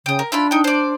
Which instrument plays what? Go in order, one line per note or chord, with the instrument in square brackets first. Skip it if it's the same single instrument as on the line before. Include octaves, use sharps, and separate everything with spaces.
[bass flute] C#3 [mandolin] G5 D#6
[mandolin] A#4
[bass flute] D4 [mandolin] E4 F4 B5
[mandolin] D#4 G5
C5 D5